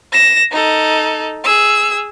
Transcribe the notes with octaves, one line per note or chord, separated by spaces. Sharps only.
A#6 E7
D#4 A4
G#4 E6